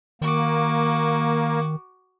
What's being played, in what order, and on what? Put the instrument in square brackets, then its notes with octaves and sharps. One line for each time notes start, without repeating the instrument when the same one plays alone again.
[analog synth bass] D#3 [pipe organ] A#3 [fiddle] F#4 D6